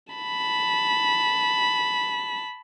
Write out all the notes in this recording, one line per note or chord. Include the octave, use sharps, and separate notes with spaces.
A5 B5